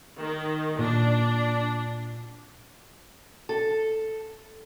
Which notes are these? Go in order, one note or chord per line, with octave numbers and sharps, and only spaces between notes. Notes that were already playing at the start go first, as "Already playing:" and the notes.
D#3
A#2 D4
A4